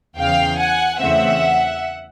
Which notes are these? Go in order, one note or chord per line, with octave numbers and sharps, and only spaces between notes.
E2 C#3 E3 F5 G5
F#5 G#5
E2 C#3 E3 A3 C4 E5 F#5